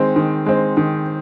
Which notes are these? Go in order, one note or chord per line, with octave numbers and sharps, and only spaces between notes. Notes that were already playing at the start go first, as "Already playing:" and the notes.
Already playing: D#3 G#3 C4
D#3
G#3 C4
D#3